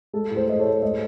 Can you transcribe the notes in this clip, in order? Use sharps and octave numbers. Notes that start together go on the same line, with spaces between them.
G#3 A4
A2
G#4 C5
G#3 D#5
A4 C#5
A2
G#3 C5 D#5